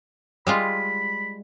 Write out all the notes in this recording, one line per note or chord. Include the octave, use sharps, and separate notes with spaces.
G3 G#3 F4 B5